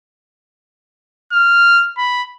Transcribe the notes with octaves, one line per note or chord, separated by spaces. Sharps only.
F6
B5